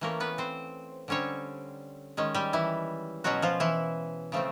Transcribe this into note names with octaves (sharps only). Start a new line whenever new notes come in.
E3 A3 A#3 C#4 A#4
B3 B4
C4 C5
D3 G3 C4 C#4 C#5
D#3 G#3 C#4
G3 G4
E3 E4
B2 F#3 G#3 C#4 F#4
F3 F4
E3 E4
C#3 F3 A3 C4